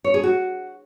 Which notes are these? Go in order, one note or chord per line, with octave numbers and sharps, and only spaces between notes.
C#5
G#4
F#4